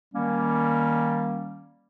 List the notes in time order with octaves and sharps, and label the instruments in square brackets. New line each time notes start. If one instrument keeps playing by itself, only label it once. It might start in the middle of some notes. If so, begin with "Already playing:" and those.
[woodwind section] D#3 G3 A#3 C#4